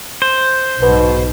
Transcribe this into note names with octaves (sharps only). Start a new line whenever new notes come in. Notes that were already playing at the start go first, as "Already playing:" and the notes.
C5
B1 G#2 B2